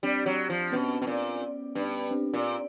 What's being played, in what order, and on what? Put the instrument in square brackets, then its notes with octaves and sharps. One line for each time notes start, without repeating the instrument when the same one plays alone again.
[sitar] G3 [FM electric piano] C4 D4
[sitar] F#3
F3
[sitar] B2 [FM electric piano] B3 C#4
[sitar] B2
A#2
G2
[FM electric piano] C4 D4
[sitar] A#2